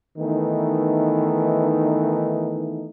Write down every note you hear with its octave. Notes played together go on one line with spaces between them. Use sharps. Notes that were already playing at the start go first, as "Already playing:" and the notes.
D#3 E3 A3 B3 D#4